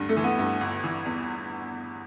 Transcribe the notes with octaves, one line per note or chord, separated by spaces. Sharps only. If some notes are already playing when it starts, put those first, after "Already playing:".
Already playing: D2 G2
A3
E3
B3
G2
G1
E3
E2